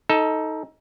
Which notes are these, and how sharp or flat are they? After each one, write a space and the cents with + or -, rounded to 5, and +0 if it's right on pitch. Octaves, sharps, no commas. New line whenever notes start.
D#4 +15 A4 +0